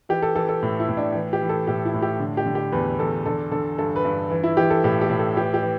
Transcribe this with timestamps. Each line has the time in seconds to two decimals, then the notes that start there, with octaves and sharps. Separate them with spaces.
0.09 E3 G4
0.22 A4
0.35 E3 A4
0.49 A4
0.63 A2
0.80 E4
0.89 A2
0.97 D4
1.14 E3
1.33 G4
1.41 E3
1.49 A4
1.67 A2 G4
1.85 E4
1.94 A2
2.02 G4
2.20 D3
2.37 G4
2.46 D3
2.55 G4
2.72 E2 B4
2.99 E2 A4
3.25 D3 A4
3.51 D3 A4
3.78 G2 A4
3.96 B4
4.05 G2
4.30 E3
4.43 E4
4.57 E3 G4
4.70 A4
4.84 A2 G4
5.01 G4
5.10 A2
5.19 A4
5.36 E3 G4
5.54 G4
5.63 E3